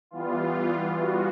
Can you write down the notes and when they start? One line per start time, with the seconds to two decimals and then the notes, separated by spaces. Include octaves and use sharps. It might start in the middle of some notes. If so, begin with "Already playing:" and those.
0.11 E3 G3 B3 F4
0.96 F#4